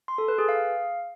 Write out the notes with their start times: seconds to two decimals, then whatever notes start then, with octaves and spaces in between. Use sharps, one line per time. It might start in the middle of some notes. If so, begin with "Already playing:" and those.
0.08 C6
0.18 A4
0.28 B4
0.38 G#4
0.49 F5